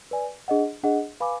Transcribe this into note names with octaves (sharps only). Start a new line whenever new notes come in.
B4 D5 G#5
D4 G#4 D#5 F#5
D4 G#4 D#5 F#5
B4 F5 G#5 B5 D6